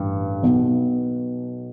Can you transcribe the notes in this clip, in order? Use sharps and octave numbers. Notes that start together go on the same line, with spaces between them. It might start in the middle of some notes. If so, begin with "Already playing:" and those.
Already playing: A1 G2
B1 B2 B3